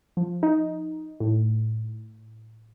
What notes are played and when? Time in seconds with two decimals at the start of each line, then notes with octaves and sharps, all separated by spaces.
0.17 F3
0.43 D#4
1.20 A2